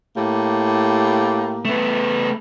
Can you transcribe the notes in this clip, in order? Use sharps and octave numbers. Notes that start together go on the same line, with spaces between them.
A2 A#3 G4
A3 B3